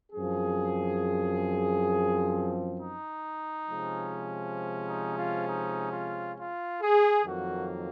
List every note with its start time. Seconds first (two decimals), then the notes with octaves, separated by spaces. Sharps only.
0.11 F#2 F3 C4 G#4
2.79 D#4
3.68 C3 F3 G#3 C#4
4.88 D#4
5.17 F4
5.47 D#4
5.91 F4
6.37 F4
6.81 G#4
7.25 F2 D#3 F#3 A#3 F#4